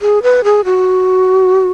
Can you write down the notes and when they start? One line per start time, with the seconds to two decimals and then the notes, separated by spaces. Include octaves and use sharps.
0.01 G#4
0.23 B4
0.44 G#4
0.65 F#4